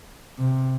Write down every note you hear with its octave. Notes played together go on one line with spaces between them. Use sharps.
C3